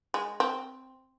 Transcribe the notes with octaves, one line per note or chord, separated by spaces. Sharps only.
G#3
C4